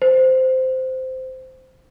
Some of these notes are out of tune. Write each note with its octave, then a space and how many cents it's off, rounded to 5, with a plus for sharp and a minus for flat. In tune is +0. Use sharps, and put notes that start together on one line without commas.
C5 -10